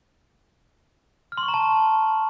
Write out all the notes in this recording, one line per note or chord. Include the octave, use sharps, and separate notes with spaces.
F6
C6
C#6
A#5
A5